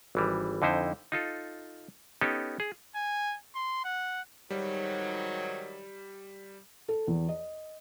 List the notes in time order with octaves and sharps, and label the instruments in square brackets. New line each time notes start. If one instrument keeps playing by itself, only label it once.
[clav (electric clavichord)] G#1 E3 G3
F2 D3 D#4 E4 C5
D#4 F4 A4
B3 C#4 D#4 G4 A4
G#4
[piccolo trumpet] G#5
C6
F#5
[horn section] G#2 D#3 F#3 [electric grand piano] G3
[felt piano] A4
E2
D#5